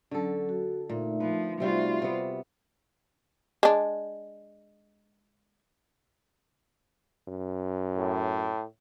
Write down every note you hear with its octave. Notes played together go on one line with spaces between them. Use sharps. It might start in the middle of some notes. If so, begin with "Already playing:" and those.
D3 F#3 C#4 A4
F#4
A#2 A3 D#4 E5
F3 B4
C3 G3 F4 F#4
C3 B3
G#3 D4
F#2
A2